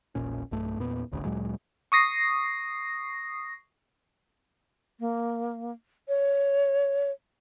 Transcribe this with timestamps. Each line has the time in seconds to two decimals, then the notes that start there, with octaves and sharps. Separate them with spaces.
0.15 E1 A#1 A#2 C#4
0.51 B1 G2 A3
0.79 E2 A#2 B3
1.12 D#1 A1 D2 C#3
1.25 D2 A#2 F#3 G#3
1.92 C#6 D#6 A#6 C7
5.00 A#3
6.08 C#5